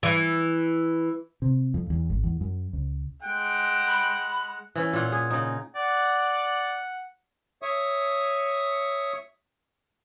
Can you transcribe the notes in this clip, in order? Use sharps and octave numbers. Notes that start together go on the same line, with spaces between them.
E3
C3
F2
E2
G#1
E2
F#2
C#2
G#3 F#5 G5
B5
E3 C#4
A#2 F4 C#5 F#5
G#4
C#3 D#4
D5 F#5
C#5 E5 C#6 D#6